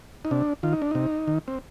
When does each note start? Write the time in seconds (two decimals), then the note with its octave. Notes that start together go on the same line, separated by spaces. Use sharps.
0.25 D#4
0.31 C3 D4
0.63 D#3 F4
0.73 D#4
0.82 D4
0.91 C3 D#4
1.28 D#3
1.48 C4